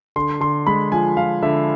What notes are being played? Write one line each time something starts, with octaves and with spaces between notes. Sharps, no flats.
D3 C6
D3 C6
G#3 B5
F3 G#5
F3 F5
D3 E5